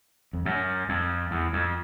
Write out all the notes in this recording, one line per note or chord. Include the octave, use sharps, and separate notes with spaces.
F2
F#2
F2
E2
F2